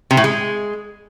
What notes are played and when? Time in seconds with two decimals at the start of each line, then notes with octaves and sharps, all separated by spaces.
0.11 C3
0.17 A2
0.24 G#3